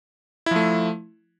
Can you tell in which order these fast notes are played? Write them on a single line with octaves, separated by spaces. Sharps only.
E4 F3 A3